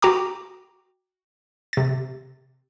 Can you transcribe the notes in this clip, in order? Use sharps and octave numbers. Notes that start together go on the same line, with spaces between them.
F#4 G5 A#5 D6
C3 A6